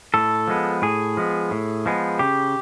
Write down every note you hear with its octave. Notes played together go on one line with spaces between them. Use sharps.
A2 A4
F3 G#3 B3
A2 G#4
F3 G#3 B3
A2
F3 G#3 B3
C#3 G4